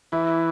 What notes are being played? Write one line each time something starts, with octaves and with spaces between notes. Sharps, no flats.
E3 E4